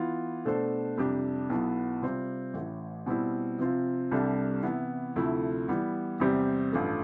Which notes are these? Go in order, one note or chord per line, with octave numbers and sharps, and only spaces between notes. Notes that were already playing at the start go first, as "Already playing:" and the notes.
Already playing: E3 B3 F4
B2 A3 D4 A4 C5
F2 C3 G3 D4 G4
B1 B2 B3 E4
C3 G3 C4 F4
A1 A2 E3
B2 G3 C4 E4
C3 F3 C4 F4
C2 C3 G3 D4 A4
C3 E3 B3 E4
D2 C3 F3 A3 E4
E3 G3 B3
E2 C3 G3 C4 G4
A1 G2 F3 A3